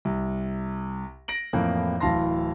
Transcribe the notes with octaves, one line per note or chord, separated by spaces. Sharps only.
C2
A#6 D7 F#7
F2 A2 E3 A#3
D1 E3 F5 A5 C6 A#6